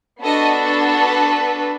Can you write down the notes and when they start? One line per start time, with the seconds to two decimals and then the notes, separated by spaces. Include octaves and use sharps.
0.22 B3 D4 F#4 A4 D#5
0.95 B4